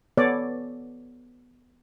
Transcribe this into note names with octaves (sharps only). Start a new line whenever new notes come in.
B3 A4 C#5 D5